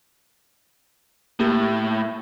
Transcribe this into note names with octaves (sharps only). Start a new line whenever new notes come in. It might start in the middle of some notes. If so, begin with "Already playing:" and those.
A2 A#3 G4